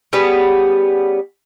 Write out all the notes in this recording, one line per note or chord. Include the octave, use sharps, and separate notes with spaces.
G3 B3 C#4 G#4